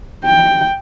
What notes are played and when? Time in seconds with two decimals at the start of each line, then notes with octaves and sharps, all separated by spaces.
0.25 G5